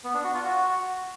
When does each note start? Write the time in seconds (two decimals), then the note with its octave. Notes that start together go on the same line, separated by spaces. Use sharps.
0.04 B3
0.14 D4
0.24 F#4
0.34 F4
0.44 F#4